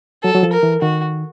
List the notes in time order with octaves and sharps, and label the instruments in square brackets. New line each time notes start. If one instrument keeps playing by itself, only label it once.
[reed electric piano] F#3 [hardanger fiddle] A4
[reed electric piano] F#3
F3
[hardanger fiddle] A#4
[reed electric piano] E3
[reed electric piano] D#3 [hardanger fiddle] F#4